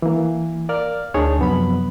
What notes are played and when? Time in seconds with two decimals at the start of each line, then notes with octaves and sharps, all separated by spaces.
0.02 E3 A#3
0.69 A#4 D5 F5 F6
1.14 D2 D4 D#4 G#4 C#5 A5
1.39 F#2 C3 F3 F#3 B3 B5